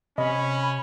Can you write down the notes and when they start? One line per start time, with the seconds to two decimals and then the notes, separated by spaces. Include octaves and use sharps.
0.18 C3 C#4 D#5 B5